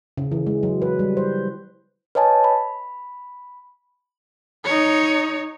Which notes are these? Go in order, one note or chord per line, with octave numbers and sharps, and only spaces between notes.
C#3
E3
G#3
F#3
B4
G3
C5
B4 C#5 D#5 G#5 A5
B5
D#4 C#5